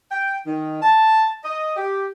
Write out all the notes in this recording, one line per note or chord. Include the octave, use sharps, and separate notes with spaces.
G5
D#3
A5
D#5
G4